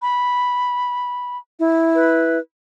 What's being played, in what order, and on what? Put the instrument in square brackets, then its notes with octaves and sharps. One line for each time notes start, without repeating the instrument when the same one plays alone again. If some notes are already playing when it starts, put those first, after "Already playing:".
[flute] B5
[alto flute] E4
[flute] B4